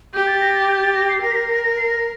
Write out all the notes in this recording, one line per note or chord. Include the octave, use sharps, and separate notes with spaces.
G4 G6
A6
A#6
A6
G6
A6
A#6
C7
A#4 A#6
C7
A#6
A#6
A#6
C7
A#6